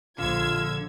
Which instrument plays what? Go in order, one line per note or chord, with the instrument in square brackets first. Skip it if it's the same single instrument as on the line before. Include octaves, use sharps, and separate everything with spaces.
[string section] A#1 E6 G#6 [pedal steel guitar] D3 [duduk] F4